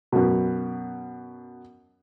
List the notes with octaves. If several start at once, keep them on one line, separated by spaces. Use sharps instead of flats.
F#2 B2